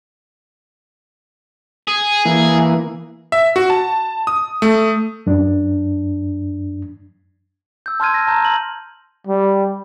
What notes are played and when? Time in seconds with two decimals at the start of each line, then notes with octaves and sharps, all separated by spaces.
1.87 G#4
2.25 E3 A#3
3.32 E5
3.56 F#4
3.70 A5
4.27 D#6
4.62 A3
5.27 F#2 D4
7.86 E6 G6
8.00 A5 C6 F6 G#6 D#7
8.14 A#6
8.27 A5 A#5 G6
8.45 F#7
9.27 G3